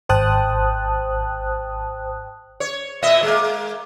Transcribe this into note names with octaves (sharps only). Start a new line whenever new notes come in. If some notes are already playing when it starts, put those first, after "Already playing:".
G#1 C5 G5 A5 D#6 F#6
C#5
A#2 D#5 E5
G#3 A#3